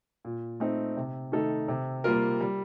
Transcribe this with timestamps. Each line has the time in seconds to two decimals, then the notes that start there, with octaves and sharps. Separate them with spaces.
0.25 A#2
0.60 A3 C4 D#4
0.96 C3
1.32 D#3 A3 D#4 A4
1.68 C3
2.04 G3 A#3 F4 A#4
2.40 G3